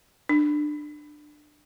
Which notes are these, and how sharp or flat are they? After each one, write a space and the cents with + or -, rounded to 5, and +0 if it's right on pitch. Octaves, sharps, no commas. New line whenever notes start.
D4 +25